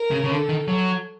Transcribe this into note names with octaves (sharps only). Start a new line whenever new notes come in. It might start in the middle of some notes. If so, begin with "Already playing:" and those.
Already playing: A#4
C#3
C#3
D3 A4
D#3
F#3